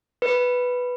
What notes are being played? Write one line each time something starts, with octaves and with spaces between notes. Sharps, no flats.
B4